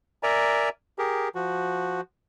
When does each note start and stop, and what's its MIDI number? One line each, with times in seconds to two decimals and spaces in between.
0.23 0.69 70
0.23 0.69 74
0.23 0.69 76
0.23 0.69 80
0.23 0.69 82
0.98 1.29 67
0.98 1.29 68
0.98 1.29 70
1.35 2.01 53
1.35 2.01 66